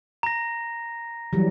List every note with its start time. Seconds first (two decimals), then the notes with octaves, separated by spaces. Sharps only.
0.23 A#5 A#6
1.33 E3 F#3 G3